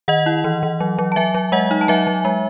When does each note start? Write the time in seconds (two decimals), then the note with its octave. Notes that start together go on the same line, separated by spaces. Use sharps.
0.08 D#3 D#5 F#5
0.26 E4
0.44 E3
0.63 E3
0.80 F#3
0.98 F#3
1.12 A5
1.16 F#3 E5 G#5
1.34 F#3
1.52 G#3 D#5 F#5
1.71 D#4
1.81 A5
1.88 F#3 E5 G#5
2.07 F#3
2.25 G#3